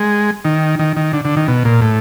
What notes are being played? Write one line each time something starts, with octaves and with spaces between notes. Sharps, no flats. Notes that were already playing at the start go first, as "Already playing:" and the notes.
Already playing: G#3
D#3
D#3
D#3
D3
D3
D#3
B2
A#2
A2